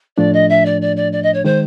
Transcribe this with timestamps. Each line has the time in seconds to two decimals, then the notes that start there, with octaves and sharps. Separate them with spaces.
0.17 A2 F3 A3 D4 D5
0.33 D#5
0.49 E5
0.66 D5
0.81 D5
0.97 D5
1.12 D5
1.23 D#5
1.34 C#5
1.44 D#3 G#3 C5